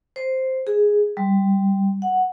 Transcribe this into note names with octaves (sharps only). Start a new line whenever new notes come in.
C5
G#4
G3
F#5